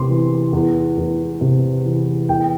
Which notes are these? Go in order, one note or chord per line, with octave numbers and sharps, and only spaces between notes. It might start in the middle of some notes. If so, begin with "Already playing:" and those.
Already playing: E2 C3 C6 D6
E3
E2
E2
C3
E3
E2 G5